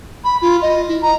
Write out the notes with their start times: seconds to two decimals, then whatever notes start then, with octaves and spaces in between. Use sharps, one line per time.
0.24 B5
0.42 F4
0.62 D#5
0.89 E4
1.02 A#5